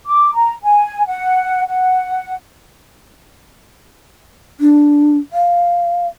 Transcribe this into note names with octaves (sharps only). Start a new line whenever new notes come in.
D6
A#5
G#5
F#5
F#5
D4
F5